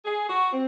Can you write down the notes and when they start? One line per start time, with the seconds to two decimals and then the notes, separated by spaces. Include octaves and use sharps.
0.04 G#4
0.28 F#4
0.50 C4